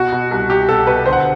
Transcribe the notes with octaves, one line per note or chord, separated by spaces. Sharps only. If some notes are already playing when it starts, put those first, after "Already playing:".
Already playing: B2 F#4
B2
C2
C2 G4
B2 A4
B2 B4
D3 C5
F#5